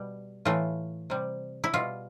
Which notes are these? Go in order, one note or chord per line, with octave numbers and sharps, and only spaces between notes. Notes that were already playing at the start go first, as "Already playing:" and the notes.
Already playing: B2 G3
A2 E3 A3 F4
C3 G3
E4
B2 G3 F4